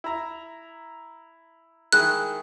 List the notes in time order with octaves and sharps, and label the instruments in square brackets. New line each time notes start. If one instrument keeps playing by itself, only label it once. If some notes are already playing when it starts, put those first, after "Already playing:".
[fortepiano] E4 A#5
[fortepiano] D#3 G#3 E4 [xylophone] F#6